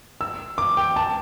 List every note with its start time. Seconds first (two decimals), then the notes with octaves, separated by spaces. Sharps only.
0.21 E6
0.58 D6
0.77 G5
0.96 A5